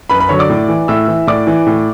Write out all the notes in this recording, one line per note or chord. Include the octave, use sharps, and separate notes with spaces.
F#2 B4 B5
B4 B5
D3 F#3 C#5 C#6
D5 D6
A2
E3
A2 E5 E6
E3
A2 D5 D6
E3
A2